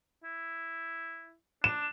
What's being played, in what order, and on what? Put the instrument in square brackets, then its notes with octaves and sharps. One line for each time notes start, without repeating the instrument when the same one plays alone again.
[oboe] E4
[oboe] D4 [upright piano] E7